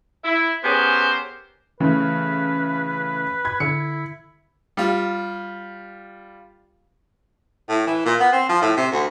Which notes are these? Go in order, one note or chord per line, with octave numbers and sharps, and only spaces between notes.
E4
B3 C#4 G4 G#4 A#4 C5
C#3 E3 A3 B4
B5 G#6
D3 E4 C#7
G3 F4
A2
E3
A#2
B3
C4
F3
A2
C3
D2